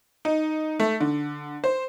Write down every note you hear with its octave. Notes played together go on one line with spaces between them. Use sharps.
D#4
A3
D3
C5